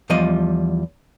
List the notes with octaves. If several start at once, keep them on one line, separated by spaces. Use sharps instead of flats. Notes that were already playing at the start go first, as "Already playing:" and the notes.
E2 F3 G3 F4 D#5